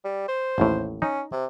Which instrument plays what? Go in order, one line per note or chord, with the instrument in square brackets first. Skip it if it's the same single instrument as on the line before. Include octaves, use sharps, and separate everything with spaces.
[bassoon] G3
C5
[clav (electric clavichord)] A1 D#2 A2
[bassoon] C#4 [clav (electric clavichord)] D#4
[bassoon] C3